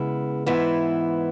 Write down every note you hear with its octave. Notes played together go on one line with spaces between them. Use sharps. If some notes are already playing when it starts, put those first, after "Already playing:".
Already playing: C#3 G#3 B3 E4
G#2 E3 B3 E4